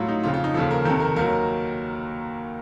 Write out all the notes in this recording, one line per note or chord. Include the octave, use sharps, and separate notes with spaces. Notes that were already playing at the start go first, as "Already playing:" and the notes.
Already playing: A2 F#3 F4
D#4
F2 C#3 F3 F4
F4
D#4
D#2 C#3 F3 A4
A#4
F2 C3 D#3 A4
A#4
D#2 D#3 F#3 A#4